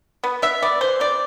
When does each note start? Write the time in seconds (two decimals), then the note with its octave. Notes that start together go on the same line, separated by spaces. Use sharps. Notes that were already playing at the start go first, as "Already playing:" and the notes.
0.24 B3
0.42 B3 E5
0.62 B3 D5
0.81 E3 C5
1.00 C3 D5